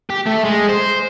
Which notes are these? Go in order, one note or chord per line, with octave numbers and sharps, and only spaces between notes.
G4
A3
G#3
C5